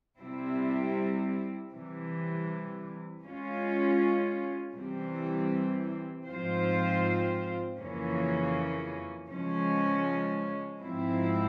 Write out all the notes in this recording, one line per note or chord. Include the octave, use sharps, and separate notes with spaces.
C3 G3 C4 E4
C3 E3 G3
G#3 C#4 F4
C3 E3 G3 C4
G#2 F3 C4 F4 C5
F2 C#3 E3 A#3 C#4
C#3 F3 G#3 C#4
G#2 F3 C4 E4